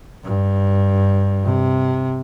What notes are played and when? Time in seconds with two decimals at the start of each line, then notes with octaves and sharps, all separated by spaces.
0.24 G2
1.44 C3